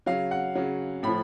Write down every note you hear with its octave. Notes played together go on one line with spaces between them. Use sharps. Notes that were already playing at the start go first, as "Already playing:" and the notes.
C#3 F#3 F5
F#5
C#3 F#3
A2 F3 B5